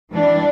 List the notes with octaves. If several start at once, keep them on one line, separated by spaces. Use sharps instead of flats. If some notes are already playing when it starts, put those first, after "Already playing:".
E3 G3 D4